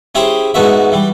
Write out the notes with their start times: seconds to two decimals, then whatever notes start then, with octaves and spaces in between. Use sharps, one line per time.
0.15 C#4 E4 G4 G#4 C5
0.54 G#2 A3 B3 F#4 E5
0.92 E3 G3